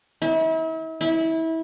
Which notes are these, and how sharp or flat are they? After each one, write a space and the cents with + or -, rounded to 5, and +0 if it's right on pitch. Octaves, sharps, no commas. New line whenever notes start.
E4 -40
E4 -25